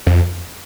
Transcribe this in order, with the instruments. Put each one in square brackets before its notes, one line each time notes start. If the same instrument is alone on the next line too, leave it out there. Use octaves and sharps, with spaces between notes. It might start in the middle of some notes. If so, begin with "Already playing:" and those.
[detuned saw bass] F2